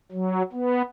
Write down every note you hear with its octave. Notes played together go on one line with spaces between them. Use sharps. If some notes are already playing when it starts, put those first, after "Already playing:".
F#3
B3